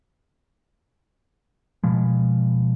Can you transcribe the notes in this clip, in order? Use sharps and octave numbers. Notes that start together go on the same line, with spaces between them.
B2 F3 G#3